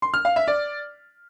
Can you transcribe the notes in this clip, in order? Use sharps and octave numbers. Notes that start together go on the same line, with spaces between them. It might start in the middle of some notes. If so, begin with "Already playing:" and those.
C6
F6
F5
E5
D5